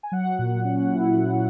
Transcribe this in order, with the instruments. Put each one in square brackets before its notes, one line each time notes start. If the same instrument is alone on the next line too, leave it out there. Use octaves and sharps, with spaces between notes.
[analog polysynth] G#5
F#3 F#5
A#2
C#4
E4
F#3